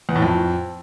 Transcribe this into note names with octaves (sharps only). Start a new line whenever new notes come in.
E2
A2
F2